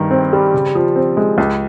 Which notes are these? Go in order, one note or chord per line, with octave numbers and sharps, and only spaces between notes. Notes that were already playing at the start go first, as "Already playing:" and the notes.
Already playing: G2 D#3
C4
G3
C#3
F3
C4
G#3
C#2